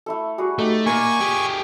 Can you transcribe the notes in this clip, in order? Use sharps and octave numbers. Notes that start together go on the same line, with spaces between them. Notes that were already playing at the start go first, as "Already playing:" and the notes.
A3 E4 A4
G3 F#4 G#4
A3 D#4 G4 G5
A#2 A#4 D5 F5 G#5 C#6
G4 G#4